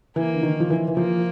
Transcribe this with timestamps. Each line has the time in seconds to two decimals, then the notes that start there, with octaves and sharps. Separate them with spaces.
0.15 E3 A#3
0.34 D3
0.43 D#3
0.60 F3
0.70 E3
0.88 E3
0.97 F3 A#3